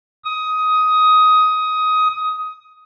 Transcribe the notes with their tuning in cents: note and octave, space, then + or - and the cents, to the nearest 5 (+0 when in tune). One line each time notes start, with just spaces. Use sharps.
D#6 +15